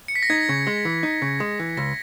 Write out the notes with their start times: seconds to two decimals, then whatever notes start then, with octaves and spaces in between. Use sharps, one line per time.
0.08 C#7
0.16 B6
0.23 A#6
0.30 D#4 G#6
0.49 C#3
0.67 G#3
0.85 E3
1.03 D#4
1.22 C#3
1.40 G#3
1.60 E3
1.77 C#2 A#6